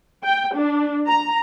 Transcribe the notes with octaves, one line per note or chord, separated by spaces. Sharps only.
G5
D4
A#5